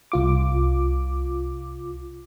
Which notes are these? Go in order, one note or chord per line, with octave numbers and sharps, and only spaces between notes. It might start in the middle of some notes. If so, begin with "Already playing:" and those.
C2 F4 D6